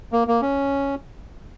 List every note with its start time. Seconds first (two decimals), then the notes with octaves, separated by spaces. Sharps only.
0.12 A#3
0.28 A#3
0.41 C#4